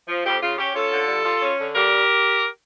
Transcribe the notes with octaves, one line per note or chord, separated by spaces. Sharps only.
F3
F2 G4
C#3 F4
C#4 G4
C#4 F4 A4
D3
G3
F4
C#4
D3
G3 G4 A#4